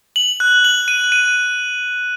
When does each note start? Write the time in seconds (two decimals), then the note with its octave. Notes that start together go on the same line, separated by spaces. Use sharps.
0.16 F#7
0.40 F#6
0.65 F#7
0.88 D#7
1.12 D#7